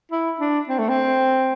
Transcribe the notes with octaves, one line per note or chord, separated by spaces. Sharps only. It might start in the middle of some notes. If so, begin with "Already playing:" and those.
E4
D4
C4
A3
C4